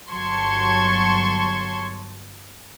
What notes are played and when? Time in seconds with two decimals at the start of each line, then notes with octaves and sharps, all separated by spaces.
0.11 G1 F#3 A5 C6 C#6 G#6